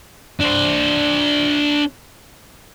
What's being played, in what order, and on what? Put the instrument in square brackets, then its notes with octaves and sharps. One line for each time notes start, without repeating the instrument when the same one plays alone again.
[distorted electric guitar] D4 C5